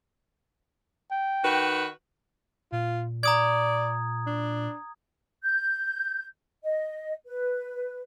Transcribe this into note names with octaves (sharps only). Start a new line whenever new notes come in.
G5
D#3 F#4 B4
A#2 F4
D5 A#5 D#6 G#6
D4
G6
D#5
B4